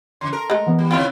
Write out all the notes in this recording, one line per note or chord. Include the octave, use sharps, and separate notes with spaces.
C#3 E3 C6
A4 A#4 A#5
G#3 A3
E3 B3 F#5
G3
C3 D#3 C4 E4 F4